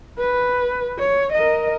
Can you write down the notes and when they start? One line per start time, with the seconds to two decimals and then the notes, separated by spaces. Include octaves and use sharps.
0.18 B4
0.99 C#5
1.33 A#4 D#5